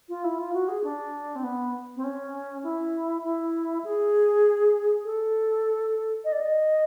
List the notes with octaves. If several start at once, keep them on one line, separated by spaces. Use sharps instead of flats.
F4
E4
F4
F#4
G#4
D4
C4
B3
C4
C#4
E4
E4
G#4
A4
D#5
D5
D#5